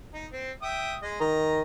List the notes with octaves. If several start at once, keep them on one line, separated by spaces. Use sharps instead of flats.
D#4
C4
E5 G5 D#6
G#3 D#5
D#3 D#5 A#5